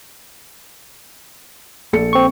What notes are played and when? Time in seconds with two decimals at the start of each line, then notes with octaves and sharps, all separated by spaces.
1.93 A#1 A4 C#7
2.13 C4 C#6